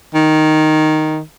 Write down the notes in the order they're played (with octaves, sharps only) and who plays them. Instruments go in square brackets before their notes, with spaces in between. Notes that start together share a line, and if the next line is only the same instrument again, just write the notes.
[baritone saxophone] D#3